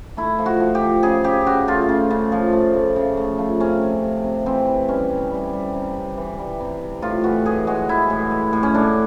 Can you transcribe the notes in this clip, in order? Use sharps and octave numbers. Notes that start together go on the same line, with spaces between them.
A3 E4
F3
F#4
F3
G4
F3
C#3 G#4
C#3 G4
C#3 F#4
A3 F4
C#3
C#3
F3
A3
A3
C#3
A3
F3
C3 C#4
C3
C3
C3
E3 C4
E3
G3 C#4
C3
G3
G3
C3
C3
E3
G3
C3
C3
A2 F4
E3 F#4
A2 G#4
G#3 F#4
E3 E4
A2
G#3
A2
C#4
A2 D4